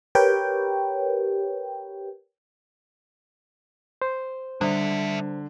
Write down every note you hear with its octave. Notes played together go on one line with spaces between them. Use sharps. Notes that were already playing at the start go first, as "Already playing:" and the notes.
G4 A#4 B4 C#5 G5
C5
D3 G3 D4 E5